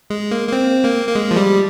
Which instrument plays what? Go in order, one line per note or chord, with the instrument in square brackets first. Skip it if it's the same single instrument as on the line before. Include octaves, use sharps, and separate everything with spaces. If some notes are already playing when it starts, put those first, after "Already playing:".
[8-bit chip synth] G#3
A#3
A#3
C4
A#3
A#3
G#3
F3
G3